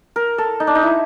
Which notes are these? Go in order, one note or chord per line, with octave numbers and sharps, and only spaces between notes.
A#4
A4
D#4
D4
D#4
E4